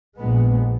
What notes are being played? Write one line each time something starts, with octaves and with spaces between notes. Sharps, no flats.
A#1 A#2 G#3 B3